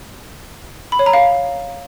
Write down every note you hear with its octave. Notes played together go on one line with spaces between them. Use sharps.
B5
C#5
A#5
F5